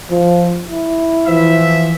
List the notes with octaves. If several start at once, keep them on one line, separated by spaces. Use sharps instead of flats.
F3
E4
E3 F3 E5